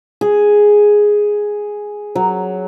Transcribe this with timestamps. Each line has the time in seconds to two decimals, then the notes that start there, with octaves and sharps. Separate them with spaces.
0.21 G#4
2.15 F#3